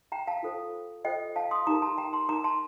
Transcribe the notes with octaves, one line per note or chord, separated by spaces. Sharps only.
G5 A#5
F5 A5
F4 A4 C5
F4 A4 C5 D#5 G5
F5 A5
C6 D#6
D#4 G4 A#4 A#5 D6
A5 C6
G5 A#5
A5 C6
D#4 A#4 A#5 D6
A5 C6